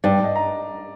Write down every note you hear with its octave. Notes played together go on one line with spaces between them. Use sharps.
G2 D5
D#5
A#5